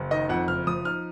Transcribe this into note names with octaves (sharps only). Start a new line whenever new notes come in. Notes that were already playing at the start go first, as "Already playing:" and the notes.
Already playing: F#1
D#3 D#5
F2 F#5
F#1 F6
F3 D#6
D#4 F6